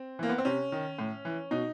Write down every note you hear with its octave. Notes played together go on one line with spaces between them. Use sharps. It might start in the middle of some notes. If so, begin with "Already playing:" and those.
Already playing: C4
E3 A#3
B3
C4
C3 C#4
D#3
A2
E3
B2 D#4